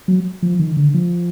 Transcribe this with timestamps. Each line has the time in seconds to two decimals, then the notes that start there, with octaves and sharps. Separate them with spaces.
0.08 F#3
0.43 F3
0.59 D#3
0.77 D3
0.94 F3